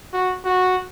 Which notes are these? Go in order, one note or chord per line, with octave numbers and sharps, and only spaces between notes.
F#4
F#4